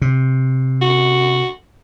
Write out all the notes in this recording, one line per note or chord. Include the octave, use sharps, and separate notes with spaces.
C3
F#4